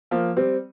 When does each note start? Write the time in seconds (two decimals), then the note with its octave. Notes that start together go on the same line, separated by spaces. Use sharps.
0.11 F3 A#3
0.37 G3 C4